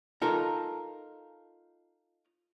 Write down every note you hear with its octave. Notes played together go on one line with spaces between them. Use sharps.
D#4 F4 A4 A#4